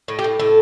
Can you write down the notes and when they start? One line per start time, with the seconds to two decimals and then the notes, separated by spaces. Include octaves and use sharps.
0.08 A2
0.19 G4
0.24 A2
0.39 A2 A4